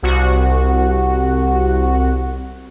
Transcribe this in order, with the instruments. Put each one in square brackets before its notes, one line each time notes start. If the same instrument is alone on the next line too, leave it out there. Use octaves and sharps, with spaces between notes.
[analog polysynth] C2 F#4